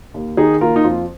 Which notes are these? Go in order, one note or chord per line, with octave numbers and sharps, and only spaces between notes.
D#2
D#3 D#4 G#4
A#3 F4 A#4
D#4
F2 F4